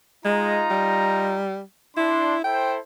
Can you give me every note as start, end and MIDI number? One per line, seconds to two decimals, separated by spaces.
0.25 0.65 56
0.25 1.40 63
0.25 1.40 65
0.25 1.40 82
0.71 1.62 55
1.97 2.37 62
1.97 2.42 64
1.97 2.37 84
2.44 2.79 64
2.44 2.79 69
2.44 2.79 72
2.44 2.73 79